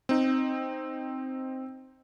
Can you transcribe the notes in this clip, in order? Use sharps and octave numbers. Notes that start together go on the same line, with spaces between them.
C4 D#4